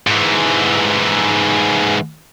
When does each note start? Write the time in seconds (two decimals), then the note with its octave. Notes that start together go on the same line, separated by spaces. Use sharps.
0.07 G#2 E3